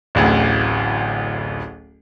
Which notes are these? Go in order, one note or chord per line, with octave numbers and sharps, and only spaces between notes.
D1 A1 D2